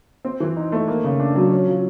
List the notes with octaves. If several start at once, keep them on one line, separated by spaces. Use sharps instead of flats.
C4
E3
D#4
A3
A#3
C#3
D4
F#3
C#4
F3